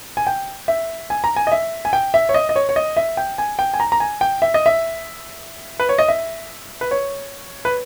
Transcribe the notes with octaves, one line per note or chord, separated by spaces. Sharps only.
G#5
G5
E5
G#5
A#5
G#5
D#5
E5
G#5
G5
E5
C#5
D#5
D#5
C#5
C#5
D#5
E5
G5
G#5
G5
G#5
A#5
A#5
G#5
G5
E5
D#5
E5
B4
C#5
D#5
E5
B4
C#5
B4